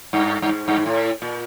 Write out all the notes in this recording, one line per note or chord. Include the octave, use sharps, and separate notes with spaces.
G2
G2
G#2
G2
G#2
A2
A#2